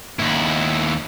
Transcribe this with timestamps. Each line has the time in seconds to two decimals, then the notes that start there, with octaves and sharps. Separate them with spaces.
0.19 D#2 E4